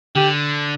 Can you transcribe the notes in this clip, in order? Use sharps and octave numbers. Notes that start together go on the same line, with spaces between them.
D3 G4